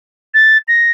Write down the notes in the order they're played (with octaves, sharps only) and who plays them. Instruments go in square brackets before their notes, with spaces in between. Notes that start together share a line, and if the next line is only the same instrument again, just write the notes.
[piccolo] A6
A#6